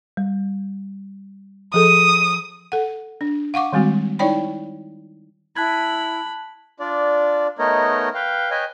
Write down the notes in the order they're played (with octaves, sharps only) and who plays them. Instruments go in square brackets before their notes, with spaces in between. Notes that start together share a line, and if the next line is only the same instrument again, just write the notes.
[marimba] G3
[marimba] F3 G#4 A4 [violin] D#6
[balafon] A4 F#5
D4
F5 F#5 C#6 D6
D#3 G3 G#3 C4 F#4
D#4 E4 C#5 D5 G5 B5
[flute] E4 [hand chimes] A5 F#6 G#6 [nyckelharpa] B5
[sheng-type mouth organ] D4 F4 D5
A3 B3 D#4 A#4 C#5 D#5
B4 F5 G5
B4 C#5 D#5 G5 G#5